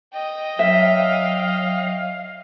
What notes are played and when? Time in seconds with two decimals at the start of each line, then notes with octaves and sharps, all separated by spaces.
0.13 D#5 G5
0.59 F#3 E5 F5